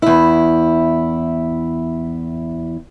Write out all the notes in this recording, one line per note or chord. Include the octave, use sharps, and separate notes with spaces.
E2 E4